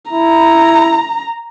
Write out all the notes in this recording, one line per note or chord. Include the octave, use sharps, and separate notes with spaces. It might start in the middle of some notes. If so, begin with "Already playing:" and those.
E4 A#5